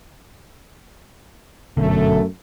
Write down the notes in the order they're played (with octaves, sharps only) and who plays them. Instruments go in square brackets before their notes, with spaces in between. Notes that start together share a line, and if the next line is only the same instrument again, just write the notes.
[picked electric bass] G1 B2 D3 [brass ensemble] F#2 A3